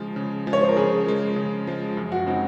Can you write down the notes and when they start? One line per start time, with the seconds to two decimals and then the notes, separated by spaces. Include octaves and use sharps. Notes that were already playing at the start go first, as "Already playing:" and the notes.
Already playing: C#3 F3 G#3
0.16 C#3
0.47 F3 G#3
0.53 C#5
0.61 C5
0.69 A#4
0.76 C#3 G#4
1.06 F3 G#3
1.36 C#3
1.67 F3 G#3
1.97 F#2
2.12 F#4
2.26 C#3 G#3 C4 D#4